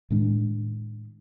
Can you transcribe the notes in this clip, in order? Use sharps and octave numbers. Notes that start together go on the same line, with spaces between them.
A2 D#3 G#3 D4